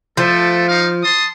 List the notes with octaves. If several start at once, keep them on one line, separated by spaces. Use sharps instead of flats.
F3 A3 A4
D#4 F5
A5 C6 D#6